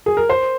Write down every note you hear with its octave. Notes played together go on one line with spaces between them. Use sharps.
G#4
A#4
C5